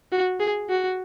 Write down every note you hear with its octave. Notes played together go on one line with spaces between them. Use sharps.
F#4
G#4
F#4